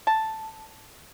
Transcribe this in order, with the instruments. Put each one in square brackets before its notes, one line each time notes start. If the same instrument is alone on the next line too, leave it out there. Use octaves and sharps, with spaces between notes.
[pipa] A5